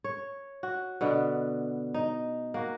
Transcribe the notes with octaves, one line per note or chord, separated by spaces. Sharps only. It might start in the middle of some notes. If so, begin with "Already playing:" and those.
C#5
F#4
B2 D3 B3
D#4
A#3 F#4